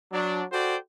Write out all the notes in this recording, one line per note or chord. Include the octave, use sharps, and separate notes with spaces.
F#3 D4
F#4 A4 C5 D5 G5